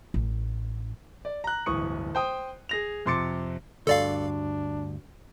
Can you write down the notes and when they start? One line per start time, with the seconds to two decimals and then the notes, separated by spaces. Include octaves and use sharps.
0.14 A1
1.25 D5
1.44 A#5 F#6
1.66 D1 G1 E3 C#6 D#6 C#7
2.15 C5 G5 D#6
2.69 G#4 A#6 F7
3.06 F2 C3 C6 D6 A6 C#7
3.87 D2 G2 D4 A4 D5 F5